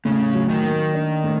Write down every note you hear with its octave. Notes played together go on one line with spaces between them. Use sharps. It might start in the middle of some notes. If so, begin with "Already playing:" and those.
A2 C#3
F#3
D#3
A#3
D4
A2